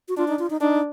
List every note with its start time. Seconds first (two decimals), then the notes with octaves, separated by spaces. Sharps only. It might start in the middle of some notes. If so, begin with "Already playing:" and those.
0.08 F#4
0.17 D4 F4
0.28 D#4
0.39 F4
0.50 D#4
0.61 D4 D#4